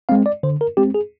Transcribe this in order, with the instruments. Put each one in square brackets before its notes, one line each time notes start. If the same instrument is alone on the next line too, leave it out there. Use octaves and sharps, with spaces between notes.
[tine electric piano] G#3 C4 F5
D5
D3 C5
A#4
G#3 C4 G4
G#4